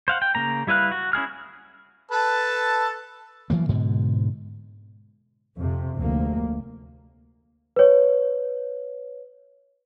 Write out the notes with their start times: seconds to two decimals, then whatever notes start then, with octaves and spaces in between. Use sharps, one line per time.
0.08 C5 F5 F#5
0.22 G5
0.35 C#3 A#3 A#5
0.67 G3 E4 B4 F5 F#6
0.92 F#4
1.13 C#4 E4 G#4 F6
2.11 A4 B4 A5
3.50 E3 F#3 A#3
3.69 G#2 B2 D3
5.57 F2 C3
5.97 F1 D2 A#3
7.76 B4 C#5